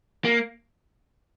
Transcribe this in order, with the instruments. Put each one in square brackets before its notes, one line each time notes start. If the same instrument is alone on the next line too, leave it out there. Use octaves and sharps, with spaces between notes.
[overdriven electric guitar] A#3